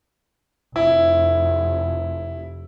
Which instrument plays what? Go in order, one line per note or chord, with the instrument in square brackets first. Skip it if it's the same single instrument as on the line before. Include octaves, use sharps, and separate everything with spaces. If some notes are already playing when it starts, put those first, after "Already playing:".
[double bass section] F1 [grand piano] E4